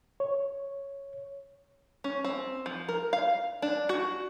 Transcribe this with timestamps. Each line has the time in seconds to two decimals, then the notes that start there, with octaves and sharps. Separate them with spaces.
0.20 C#5
2.04 C#4
2.24 C4
2.66 F3
2.89 A#4
3.13 F5
3.62 D4
3.89 F#4